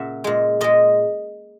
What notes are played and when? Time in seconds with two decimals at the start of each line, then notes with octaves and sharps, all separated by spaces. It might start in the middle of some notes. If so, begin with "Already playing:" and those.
Already playing: A#2 C#3 E5 F#5
0.24 A#2 G#3
0.61 A#2 G#3 D#5